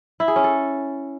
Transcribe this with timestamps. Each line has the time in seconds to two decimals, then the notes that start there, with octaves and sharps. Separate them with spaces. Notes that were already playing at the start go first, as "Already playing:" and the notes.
0.20 E4
0.28 G#4
0.36 C#4
0.44 A4